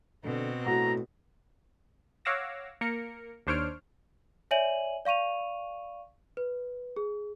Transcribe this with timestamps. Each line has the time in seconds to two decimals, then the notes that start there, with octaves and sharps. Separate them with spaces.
0.24 B2 D3 C4
0.66 A2 F#4 A#5
2.25 C#5 F5 F#5 D6 E6 A#6
2.81 A#3 A#4 C#7
3.47 D#2 D4 C5 C#5 F6 D7
4.51 C#5 D5 E5 G#5 D#7 F#7
5.05 D5 F5 C#6 D#7 F7
6.37 B4
6.97 G#4